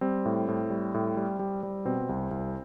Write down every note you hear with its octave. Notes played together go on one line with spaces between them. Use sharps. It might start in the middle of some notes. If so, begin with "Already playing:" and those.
G3 C4
A2
A2
G3
A2
G3
G3
G3
B2 C4
C2
C2